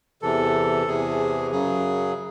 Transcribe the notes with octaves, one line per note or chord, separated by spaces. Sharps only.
E2 C3 E3 A4
E2 C3 E3 G#4
F#2 C#3 F#3 G#4